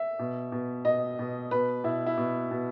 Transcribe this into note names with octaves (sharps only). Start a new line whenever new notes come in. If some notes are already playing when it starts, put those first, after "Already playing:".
Already playing: E5
B2
B2
B2 D#5
B2
B2 B4
B2 E4
E4
B2
B2